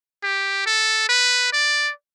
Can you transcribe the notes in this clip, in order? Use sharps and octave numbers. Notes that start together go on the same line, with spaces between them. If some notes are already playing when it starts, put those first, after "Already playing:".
G4
A4
B4
D5